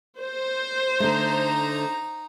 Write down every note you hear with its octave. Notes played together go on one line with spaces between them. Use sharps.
C5
D3 A3 D#4 A#5